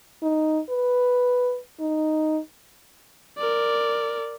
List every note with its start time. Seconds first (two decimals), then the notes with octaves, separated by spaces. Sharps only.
0.23 D#4
0.70 B4
1.80 D#4
3.38 A#4 D5